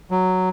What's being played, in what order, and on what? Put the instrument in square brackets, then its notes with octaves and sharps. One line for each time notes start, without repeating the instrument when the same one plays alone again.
[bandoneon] F#3